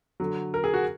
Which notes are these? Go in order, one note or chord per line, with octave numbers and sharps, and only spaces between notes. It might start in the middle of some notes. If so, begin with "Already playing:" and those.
D3 F#3
A#4
G#4
F#4